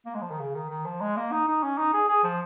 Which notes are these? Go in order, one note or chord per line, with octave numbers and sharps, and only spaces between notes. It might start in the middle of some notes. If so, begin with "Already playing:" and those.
A#3
G#3
F3
D#3
C#3
D#3
D#3
F3
G#3
A#3
D#4
D#4
C#4
D#4
G#4
G#4
F3